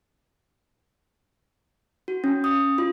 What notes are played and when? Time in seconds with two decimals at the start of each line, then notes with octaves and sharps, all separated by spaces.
2.08 F#4
2.24 C#4
2.44 D#6
2.78 F4